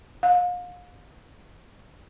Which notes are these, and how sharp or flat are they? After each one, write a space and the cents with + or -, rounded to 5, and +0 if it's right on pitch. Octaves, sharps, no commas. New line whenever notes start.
F5 +35